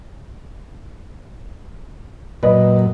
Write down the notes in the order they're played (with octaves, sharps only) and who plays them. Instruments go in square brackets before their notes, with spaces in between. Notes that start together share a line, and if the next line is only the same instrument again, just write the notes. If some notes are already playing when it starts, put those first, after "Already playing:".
[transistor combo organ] F#2 A#2 [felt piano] B4 D#5